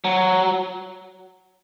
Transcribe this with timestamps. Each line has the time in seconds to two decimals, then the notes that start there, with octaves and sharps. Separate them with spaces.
0.04 F#3